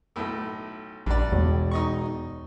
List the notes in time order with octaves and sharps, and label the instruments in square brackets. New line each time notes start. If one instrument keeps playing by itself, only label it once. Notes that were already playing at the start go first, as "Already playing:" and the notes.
[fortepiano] B1 A2
[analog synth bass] A#1 [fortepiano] G2 D5
[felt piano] E1 [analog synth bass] E2
[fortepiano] D#4 D#5 C#6